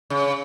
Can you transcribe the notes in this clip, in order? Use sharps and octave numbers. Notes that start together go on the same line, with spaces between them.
C#3